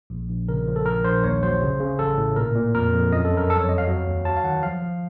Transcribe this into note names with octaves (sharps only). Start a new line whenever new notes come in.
A#1
A#1
C#3 A#4
F3
A4
A#1 A#4
A#1 C5
D#2 C#5
F#3 C5
C#3
C#3
A1 A4
A2
A#2 A#4
A#2
F2 A#4
F2
F#2 D#5
A4
F#2
A#4
F2 A4
C#5
F#3 D#5
F5
F#3
D#2
F#3 A5
F5
D#3 F#5
F3 F5
F3